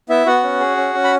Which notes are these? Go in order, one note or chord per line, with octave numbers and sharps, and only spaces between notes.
B3 E4 E5
B3 F#4 F#5
C#4
G#4
C#4
C#4
B5